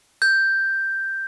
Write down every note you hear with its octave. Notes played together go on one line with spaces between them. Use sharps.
G6